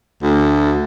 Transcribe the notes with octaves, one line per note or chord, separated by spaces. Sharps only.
D2